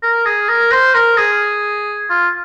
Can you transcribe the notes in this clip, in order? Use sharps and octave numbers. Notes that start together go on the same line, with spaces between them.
A#4
G#4
A#4
C5
A#4
G#4
F4